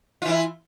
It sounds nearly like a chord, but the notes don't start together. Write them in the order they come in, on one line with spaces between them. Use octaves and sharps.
F4 E3 E4